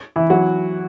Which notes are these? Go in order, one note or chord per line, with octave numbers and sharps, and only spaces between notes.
E3 E4
F#3 F#4